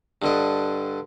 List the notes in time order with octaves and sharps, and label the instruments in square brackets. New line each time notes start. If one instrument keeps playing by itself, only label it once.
[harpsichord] G2 D3 D#5